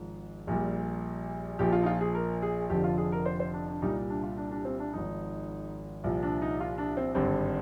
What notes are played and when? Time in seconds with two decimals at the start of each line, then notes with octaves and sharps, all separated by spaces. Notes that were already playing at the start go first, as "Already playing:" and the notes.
Already playing: G#1 G#2 F3
0.47 A#1 A#2 G3
1.59 A#1 A#2 F3 G4
1.72 F4
1.83 D#4
1.86 F4
2.01 G#4
2.15 A#4
2.42 G#4
2.70 F1 F2 D3 F3 G4
2.84 F4
2.98 G#4
3.12 A#4
3.25 C5
3.39 C5
3.53 D4
3.68 D4
3.82 C2 A#2 G3 D#4
4.10 D4
4.23 F4
4.37 D4
4.51 D4
4.65 C4
4.79 D4
4.94 G#1 G#2 F3 D#4
6.04 C2 A#2 F3
6.23 D4
6.42 D#4
6.60 F4
6.78 D4
6.97 C4
7.15 G#1 G2 D3 C4